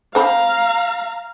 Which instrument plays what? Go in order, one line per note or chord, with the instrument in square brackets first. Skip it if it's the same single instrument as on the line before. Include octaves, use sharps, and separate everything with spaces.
[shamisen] C4 C5 B5 [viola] F5 A#5